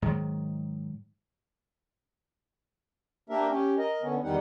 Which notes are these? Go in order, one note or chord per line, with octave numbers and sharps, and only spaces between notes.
G#2 D#3 F#3
A#3 D4 G4 A#4 E5
C#4 G4
A#4 D#5
D3 B3 C#4
E2 D#3 G3 D#4 G4 F#5